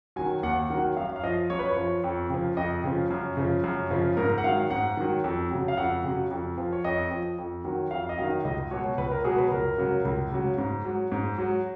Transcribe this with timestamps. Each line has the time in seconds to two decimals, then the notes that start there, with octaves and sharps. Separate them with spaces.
0.16 D#3 F#3 G#5
0.43 D#2 F#5
0.70 D#3 F#3 F#5
0.97 F#2 F5
1.16 F5
1.23 F3 D#5
1.50 F#2 C#5
1.59 B4
1.69 C#5
1.77 F3
2.04 F2
2.30 C#3 F3
2.57 F2 D#5
2.84 C#3 F3
3.11 F#2
3.37 C#3 F3
3.64 F#2
3.91 C#3 F3
4.17 G#2 A#4
4.38 F#5
4.44 D#3 F#3 F5
4.70 G#2 F#5
4.97 D#3 F#3
5.24 F2
5.51 C#3 F#3
5.68 F5
5.77 F2 F#5
6.04 C#3 F#3
6.31 F2
6.58 F3
6.72 C#5
6.84 F2 D#5
7.11 F3
7.38 F2
7.64 D#3 F#3
7.91 F2 F5
8.09 D#5
8.18 F#3 F5
8.22 D#3
8.44 C#2 D#5
8.71 B2 F#3 C#5
8.98 C#2 B4
9.11 A#4
9.24 B2 F#3 G#4
9.38 B4
9.51 C#2 A#4
9.78 C#3 F#3
10.05 C#2
10.31 C#3 F#3
10.58 G#2
10.85 F#3
11.12 G#2
11.38 F#3